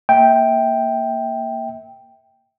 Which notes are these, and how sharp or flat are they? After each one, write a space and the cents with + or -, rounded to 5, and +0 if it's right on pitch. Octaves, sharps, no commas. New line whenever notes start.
A#3 -10 E5 -25 G5 +0